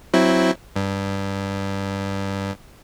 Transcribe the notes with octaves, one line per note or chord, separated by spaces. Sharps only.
F#3 C4 E4
G2